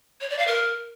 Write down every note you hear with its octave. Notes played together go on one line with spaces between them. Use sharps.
C#5
D5
F5
A#4